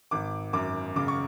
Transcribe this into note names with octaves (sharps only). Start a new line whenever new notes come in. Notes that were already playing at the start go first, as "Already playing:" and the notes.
G#1 D6
F#2 D6
C#3 D6
C#6